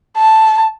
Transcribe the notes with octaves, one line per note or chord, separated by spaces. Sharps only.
A5